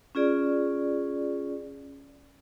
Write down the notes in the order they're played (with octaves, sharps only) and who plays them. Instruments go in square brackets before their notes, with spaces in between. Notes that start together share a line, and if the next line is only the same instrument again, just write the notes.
[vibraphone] C#4 F4 G#4 D5